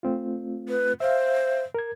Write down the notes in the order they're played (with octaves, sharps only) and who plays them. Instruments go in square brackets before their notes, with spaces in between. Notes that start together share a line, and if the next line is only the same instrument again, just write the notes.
[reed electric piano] A3 C4 F4
[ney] B4
[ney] C5 [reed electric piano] E5 F5
[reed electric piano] A#4 G#6